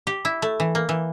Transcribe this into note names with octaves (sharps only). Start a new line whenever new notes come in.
G4
E4
A3
E3
A#3
E3